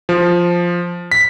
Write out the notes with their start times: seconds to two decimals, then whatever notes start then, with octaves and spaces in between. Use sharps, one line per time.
0.09 F3
1.12 B6